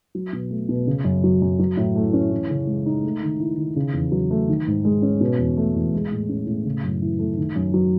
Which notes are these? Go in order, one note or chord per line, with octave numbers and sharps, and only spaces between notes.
F#3
B2
A3
B2
C#3
F#2
F#3
F#2
F#3
A2
A3
C#4
E3
C#3
G#3
D#4
A3
D#3
E4
D#3
C#3
E2
F#3
A3
D#3
G#2
G#3
C#4
B2
E2
A3
E2
G#3
A2
C#4
A2
C#3
F#2
E3
A3
D#3
F#2
F#3